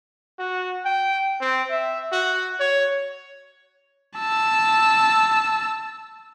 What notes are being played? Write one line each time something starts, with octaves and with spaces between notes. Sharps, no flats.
F#4
G5
C4
E5
F#4
C#5
A5 E6